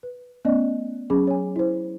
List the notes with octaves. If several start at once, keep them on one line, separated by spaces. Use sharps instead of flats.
B4
A3 B3 C#4 D5 D#5
F#3 C#4 G#4 B5 D6
C#5 G#5
E4 C5